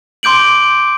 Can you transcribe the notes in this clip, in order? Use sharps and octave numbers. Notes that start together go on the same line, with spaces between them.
C6 D6 G6 D7 F#7